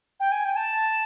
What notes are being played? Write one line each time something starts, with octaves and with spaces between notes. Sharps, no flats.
G5
G#5
G5
A5